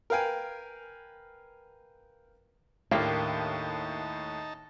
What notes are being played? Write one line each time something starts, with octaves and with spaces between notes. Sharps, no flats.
A#4 B4 F5 G5 G#5
D#2 A2 A#3 D4 D#4 G4 F5 A5